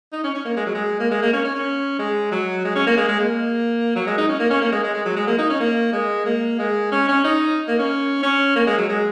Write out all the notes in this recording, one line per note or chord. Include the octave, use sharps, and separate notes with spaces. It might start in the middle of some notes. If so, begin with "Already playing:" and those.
D#4
C#4
C#4
A#3
G#3
F#3
G#3
A#3
G#3
A#3
C#4
C#4
C#4
G#3
F#3
G#3
C#4
A#3
G#3
G#3
A#3
F#3
G#3
D#4
C#4
A#3
C#4
A#3
G#3
G#3
G#3
F#3
G#3
A#3
D#4
C#4
A#3
G#3
A#3
G#3
C#4
C#4
D#4
A#3
C#4
C#4
A#3
G#3
F#3
G#3